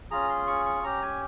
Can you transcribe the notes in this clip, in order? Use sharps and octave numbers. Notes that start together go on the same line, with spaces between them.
C#4 F4 G#4 A#5
C6
C#6
C#6
C#4 G4 A#5
G#5